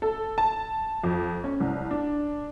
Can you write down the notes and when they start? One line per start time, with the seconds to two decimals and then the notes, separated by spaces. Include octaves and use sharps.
0.02 A4
0.38 A5
1.04 F2
1.44 C#4
1.60 C2
1.91 D4